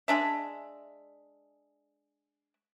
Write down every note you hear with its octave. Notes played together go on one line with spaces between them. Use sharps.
G#3 D4 E5